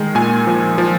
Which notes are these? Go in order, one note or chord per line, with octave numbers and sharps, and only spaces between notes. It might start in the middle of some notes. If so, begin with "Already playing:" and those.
Already playing: D#3 G#3
A#2 G#5
F3
F3